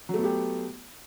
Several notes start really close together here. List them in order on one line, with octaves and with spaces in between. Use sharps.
F#3 A3 B3 G4